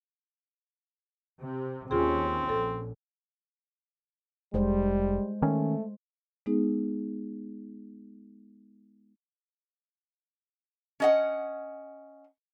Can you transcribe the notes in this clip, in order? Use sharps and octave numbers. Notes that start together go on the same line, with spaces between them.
C3
D#2 C4 C#4 F4 G#4
A#1 A4
F1 G3 G#3 C5
D#3 A3 C#4
G#3 B3 D#4 G#4
C#4 D#5 F#5